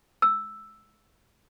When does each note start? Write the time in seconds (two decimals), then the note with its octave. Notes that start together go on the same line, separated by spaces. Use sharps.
0.22 E6